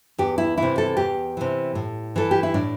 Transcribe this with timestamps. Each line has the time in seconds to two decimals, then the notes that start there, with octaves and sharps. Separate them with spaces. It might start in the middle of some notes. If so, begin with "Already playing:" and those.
0.18 E2 G4
0.38 E4
0.58 C3 E3 E4
0.78 A4
0.97 E2 G4
1.37 C3 E3
1.75 A2
2.16 E3 A4
2.31 G4
2.43 E4
2.54 A2 D4